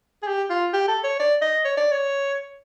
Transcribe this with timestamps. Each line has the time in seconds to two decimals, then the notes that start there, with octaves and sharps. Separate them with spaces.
0.23 G#4
0.28 G4
0.50 F4
0.73 G4
0.88 A4
1.04 C#5
1.19 D5
1.42 D#5
1.65 C#5
1.77 D5
1.92 C#5